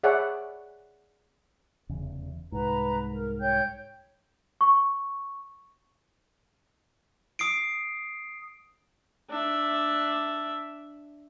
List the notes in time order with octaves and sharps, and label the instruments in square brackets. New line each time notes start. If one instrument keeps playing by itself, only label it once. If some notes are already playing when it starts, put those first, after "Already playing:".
[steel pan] G#4 C#5 D5 E5 F#5
[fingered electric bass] F1 E2 C#3
[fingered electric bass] C2 G#2 [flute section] B4 A#5
[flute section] A#4
C#5 G5 G6
[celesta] C#6
[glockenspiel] D#6 C7 D7
[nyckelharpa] D4 E5